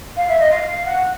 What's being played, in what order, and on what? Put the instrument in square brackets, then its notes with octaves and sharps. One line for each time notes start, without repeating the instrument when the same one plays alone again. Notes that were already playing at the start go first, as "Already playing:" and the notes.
[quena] F5
E5
D#5
F5
F5
F#5